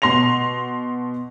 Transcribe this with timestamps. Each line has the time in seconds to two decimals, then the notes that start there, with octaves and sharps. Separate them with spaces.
0.02 B2 C6 A#6 F7